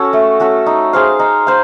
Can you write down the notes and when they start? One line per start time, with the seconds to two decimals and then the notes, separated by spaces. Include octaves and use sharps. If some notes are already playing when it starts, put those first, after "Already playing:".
Already playing: C#4 F#4 A4
0.13 A3
0.40 C#4 F#4 A4
0.66 D#4
0.93 G#4 C5 F5
1.19 D#4
1.47 C5 F5